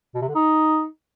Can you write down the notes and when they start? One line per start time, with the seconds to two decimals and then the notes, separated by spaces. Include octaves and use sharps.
0.15 B2
0.22 C3
0.28 D3
0.35 D#4